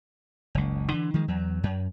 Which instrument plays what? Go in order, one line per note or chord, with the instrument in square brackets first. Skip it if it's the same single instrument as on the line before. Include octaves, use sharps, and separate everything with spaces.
[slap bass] F#1 C#2
D3 E3
D#3 F3 G#3
E2 F#3
F#2